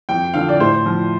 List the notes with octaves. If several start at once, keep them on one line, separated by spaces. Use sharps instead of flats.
F2 G5
D3 F3 F5
D5
A2 C5
F3